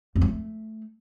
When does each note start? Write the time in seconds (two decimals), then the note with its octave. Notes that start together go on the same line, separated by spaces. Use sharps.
0.16 F2
0.21 F#3
0.27 A3